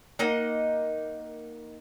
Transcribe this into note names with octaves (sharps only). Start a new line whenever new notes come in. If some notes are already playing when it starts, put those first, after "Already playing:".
A#3 D#4 D#5 F#5